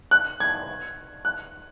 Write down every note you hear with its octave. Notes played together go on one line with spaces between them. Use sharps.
F#6
G#6
F#6